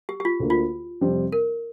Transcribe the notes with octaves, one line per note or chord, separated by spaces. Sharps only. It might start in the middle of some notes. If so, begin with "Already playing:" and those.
G4
G4
F4
D2 D3 A#3
F4
F2 C3 G3 C4
A#4